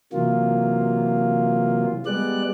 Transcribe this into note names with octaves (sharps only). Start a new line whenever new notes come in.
C3 E3 F#3 A#3 F4
G3 G#3 B3 D5 F#6